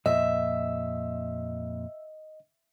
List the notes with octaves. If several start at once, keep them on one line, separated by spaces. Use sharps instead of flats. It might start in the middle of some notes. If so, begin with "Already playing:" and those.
F2 A#2 D#5 E5